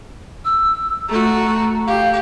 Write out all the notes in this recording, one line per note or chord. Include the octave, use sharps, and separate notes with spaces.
E6
A3 F#4 A#5
G4 F5